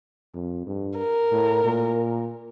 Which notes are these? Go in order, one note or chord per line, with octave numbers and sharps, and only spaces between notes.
F2
G2
A#4
A2
A#2